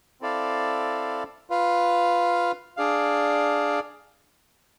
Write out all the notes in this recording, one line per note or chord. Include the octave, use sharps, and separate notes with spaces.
C4 E4 A4 D5 F5
F4 B4 F5
D4 G#4 D5 F5